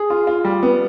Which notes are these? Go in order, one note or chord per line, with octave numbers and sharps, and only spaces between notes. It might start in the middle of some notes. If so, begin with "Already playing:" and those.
Already playing: G#4
F4
F4
G3
B3